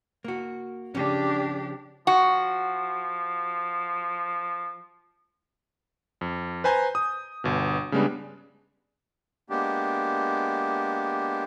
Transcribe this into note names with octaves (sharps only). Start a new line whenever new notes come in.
A#3 F#4
C#3 F3 C#4 D4 G4
F3 F#4
F2
B4 C5 G#5 A#5 G6
D#6
G1 B2
C#3 G3 G#3 B3 D4
G#3 A#3 B3 D4 G4